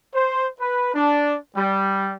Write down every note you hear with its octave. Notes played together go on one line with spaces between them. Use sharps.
C5
B4
D4
G3